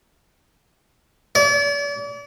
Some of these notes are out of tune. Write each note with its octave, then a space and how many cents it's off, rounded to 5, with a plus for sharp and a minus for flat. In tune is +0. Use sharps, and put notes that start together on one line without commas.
D5 -40